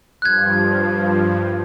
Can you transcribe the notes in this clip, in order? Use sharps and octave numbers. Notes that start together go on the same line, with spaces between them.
G2 F3 F#6 G#6